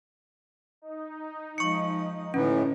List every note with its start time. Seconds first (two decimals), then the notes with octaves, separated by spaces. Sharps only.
0.82 D#4
1.58 F3 G#3 C#6 C#7
2.34 A2 D3 E3 C#4